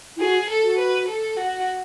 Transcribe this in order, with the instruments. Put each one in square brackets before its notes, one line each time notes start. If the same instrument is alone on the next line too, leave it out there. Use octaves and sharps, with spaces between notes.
[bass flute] E4
[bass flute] F#4 [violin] G#4
[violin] A4
[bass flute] F#4
[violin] B4
A4
F#4